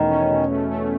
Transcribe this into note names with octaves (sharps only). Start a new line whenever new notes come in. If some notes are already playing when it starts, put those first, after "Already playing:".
Already playing: E2 B2 D#3 A3 C#4
C#4
B2
A3
A3